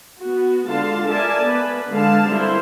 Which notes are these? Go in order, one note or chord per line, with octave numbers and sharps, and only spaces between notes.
B3 F#4
D3 G#3 F4 F5 A5
A#4 D5 E5 G#5 A5
B3 B4
D3 G#3 F5 A5
G3 C4 E4 A4 A#4 C5